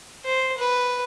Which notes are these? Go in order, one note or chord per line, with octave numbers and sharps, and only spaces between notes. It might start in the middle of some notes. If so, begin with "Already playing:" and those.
C5
B4